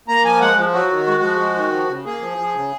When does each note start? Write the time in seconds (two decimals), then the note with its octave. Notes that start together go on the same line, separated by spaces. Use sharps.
0.08 A#3 A#5
0.24 F3 G#5
0.41 G#3 F#5
0.58 F3
0.73 F#3 F#4
0.90 D#3
1.07 G#3
1.23 F3
1.40 G#3
1.56 D#3
1.73 F3
1.89 C#3
2.05 A#3 G#4
2.22 F3
2.38 F3
2.55 C#3